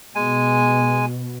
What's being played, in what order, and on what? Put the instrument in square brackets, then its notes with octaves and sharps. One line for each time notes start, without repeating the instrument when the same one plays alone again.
[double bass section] B2 [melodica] G#3 G#5